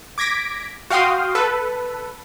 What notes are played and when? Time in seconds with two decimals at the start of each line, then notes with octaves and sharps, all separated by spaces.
0.18 D6 G#6 A#6 B6 D7
0.90 F#4 F5 G5 C6 D#6
1.35 A4 B4